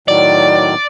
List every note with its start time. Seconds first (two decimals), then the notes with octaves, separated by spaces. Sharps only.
0.08 A2 D#3 F#3 D5